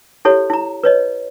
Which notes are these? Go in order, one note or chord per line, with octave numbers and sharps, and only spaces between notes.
E4 G4 A4 C#5
E4 A#5
B4 C#5 D#5